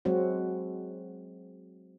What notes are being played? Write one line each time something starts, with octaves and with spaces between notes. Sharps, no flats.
F#3 G#3 C4 F#4